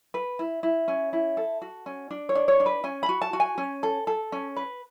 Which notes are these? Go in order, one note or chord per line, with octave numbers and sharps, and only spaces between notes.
B4
E4
E4
C#4
E4
A4
F#4
C#4
D4
C#5
D4
C#5
D4
B4
C#4 G#5
B5
F#4
A5
F#4
G#5
C#4
A4
A4
C#4
B4